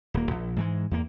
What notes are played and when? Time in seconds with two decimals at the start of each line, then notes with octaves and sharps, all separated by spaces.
0.14 D#1 A#3
0.31 A#1
0.56 G#2 E3 G#3
0.91 E2 A#3